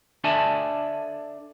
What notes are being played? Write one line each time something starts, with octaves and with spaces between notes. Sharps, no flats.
D4 A4 D5 E5 G#5 A5